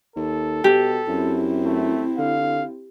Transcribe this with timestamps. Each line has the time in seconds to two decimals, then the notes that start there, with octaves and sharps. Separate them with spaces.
0.16 D#2 A4
0.64 B2 G4
1.08 F#2 C4 E4
1.66 A3
2.18 D3 F5